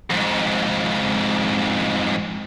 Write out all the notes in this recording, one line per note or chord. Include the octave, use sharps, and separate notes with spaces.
F2 G#2